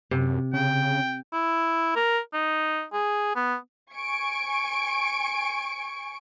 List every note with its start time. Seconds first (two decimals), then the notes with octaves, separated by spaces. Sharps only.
0.11 F#2 C3
0.53 C#3 G5
1.33 E4
1.96 A#4
2.34 D#4
2.93 G#4
3.36 B3
3.94 G#5 C#6 D7